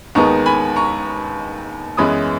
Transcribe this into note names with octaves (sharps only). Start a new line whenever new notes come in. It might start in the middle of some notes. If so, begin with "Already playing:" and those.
D#2 D#3 G#3 B3 A#5 C#6
G#5 B5
A#5 C#6
F#2 E3 G#3 B3 B5 D#6